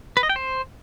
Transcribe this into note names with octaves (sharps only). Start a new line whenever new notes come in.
B4
D#5
G5
C5